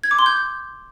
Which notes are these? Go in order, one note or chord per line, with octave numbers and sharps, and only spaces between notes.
G#6
D6
C6
G6